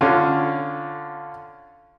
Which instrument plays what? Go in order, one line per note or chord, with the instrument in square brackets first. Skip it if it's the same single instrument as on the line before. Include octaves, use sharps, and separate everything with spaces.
[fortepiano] D3 C#4 F4